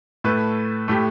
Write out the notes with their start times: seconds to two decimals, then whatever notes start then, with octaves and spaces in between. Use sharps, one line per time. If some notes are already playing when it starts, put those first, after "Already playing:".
0.24 A2 A3 B4
0.88 A2 A3 G4